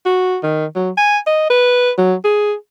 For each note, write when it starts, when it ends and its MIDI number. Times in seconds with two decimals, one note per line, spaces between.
0.06 0.37 66
0.43 0.65 51
0.75 0.90 54
0.97 1.18 80
1.26 1.47 75
1.50 1.91 71
1.98 2.14 54
2.24 2.53 68